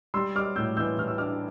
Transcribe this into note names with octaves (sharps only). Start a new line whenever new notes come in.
G3 C6 E6
G3 D6 F6
A2 E6 G6
E3 E6 G6
E3 F6
E6
D4 D6 F6